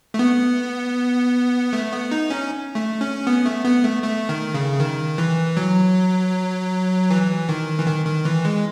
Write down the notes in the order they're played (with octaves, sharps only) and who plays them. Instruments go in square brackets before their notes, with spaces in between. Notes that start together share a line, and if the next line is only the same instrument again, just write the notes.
[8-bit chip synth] A3
B3
A3
B3
D#4
C#4
A3
C#4
B3
A3
B3
A3
A3
D#3
C#3
D#3
E3
F#3
E3
D#3
E3
D#3
D#3
E3
G#3